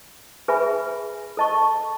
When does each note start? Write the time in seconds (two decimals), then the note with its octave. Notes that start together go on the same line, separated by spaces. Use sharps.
0.48 G#4 B4 E5 G#5 B5
1.37 A4 D#5 A5 C#6